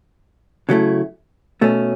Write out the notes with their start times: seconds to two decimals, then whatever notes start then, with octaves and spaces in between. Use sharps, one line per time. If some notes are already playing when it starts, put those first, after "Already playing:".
0.69 C#3 F#3 A3 E4
1.61 B2 A3 C#4